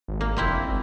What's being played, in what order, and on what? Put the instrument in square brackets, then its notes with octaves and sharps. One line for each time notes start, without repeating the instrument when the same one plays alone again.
[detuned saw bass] G#1
[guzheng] A#3
[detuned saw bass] F1 [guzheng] A#3 C4 E4
[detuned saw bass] G#1